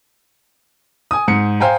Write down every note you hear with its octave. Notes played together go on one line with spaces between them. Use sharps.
G#5 D#6
G#2 C#7
C5 F5 G5 G#5 A#5